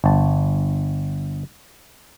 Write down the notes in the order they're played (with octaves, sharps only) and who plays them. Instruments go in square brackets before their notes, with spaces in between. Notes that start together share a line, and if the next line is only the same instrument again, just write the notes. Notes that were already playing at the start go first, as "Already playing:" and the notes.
[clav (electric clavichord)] G1 A5